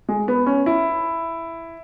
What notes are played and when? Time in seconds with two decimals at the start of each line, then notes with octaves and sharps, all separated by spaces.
0.09 G#3
0.28 B3
0.46 C#4
0.66 E4